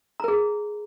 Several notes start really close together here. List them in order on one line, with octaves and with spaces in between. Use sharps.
A#5 A#4 G#4